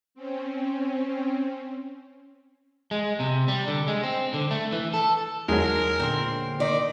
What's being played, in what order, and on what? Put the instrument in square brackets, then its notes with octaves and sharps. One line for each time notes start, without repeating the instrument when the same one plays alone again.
[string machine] C4 C#4
[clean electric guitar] G#3
C3
G3
D3
G#3
C4
D3
A3
E3
A4
[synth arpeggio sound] E2 D#4 [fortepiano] F#3 G#3 [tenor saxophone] A#4
[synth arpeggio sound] A#2 D3 C6 [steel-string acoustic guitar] C4
[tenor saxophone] D#3 [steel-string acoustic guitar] D5